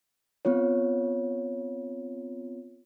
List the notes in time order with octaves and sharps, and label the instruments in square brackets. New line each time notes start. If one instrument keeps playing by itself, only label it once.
[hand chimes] B3 C4 F4 C#5